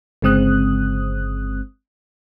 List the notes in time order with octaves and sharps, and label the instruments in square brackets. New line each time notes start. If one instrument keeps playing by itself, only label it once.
[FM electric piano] G1 C#3 G#3 C4 D#6 F#6